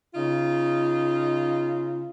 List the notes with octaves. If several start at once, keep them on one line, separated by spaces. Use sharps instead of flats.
C#3 D#4 F4